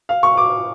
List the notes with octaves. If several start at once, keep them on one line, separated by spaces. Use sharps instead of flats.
F5
C#6
D6